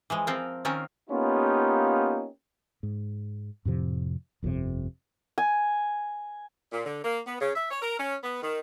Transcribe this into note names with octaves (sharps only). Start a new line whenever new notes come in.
E3 F3 G#3
F3 C4 F4 A#4
D#3 C4 C#4 F4 A#4
A#3 B3 C#4 D#4 F4 G4
G#2
F2 A2 C3 F3
G1 F2 A2 C3
G#5
A#2
D3
A#3
B3
C#3
E5
C#5
A#4
C#4
B3
D#3